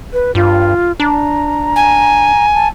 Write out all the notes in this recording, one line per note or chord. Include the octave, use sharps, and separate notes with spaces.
B4
G2 F4
D4 A#5
G#5
A5